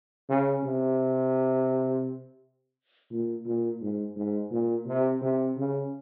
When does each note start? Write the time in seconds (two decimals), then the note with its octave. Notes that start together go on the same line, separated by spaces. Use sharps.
0.29 C#3
0.64 C3
3.11 A#2
3.46 A#2
3.82 G#2
4.16 G#2
4.51 A#2
4.87 C3
5.22 C3
5.57 C#3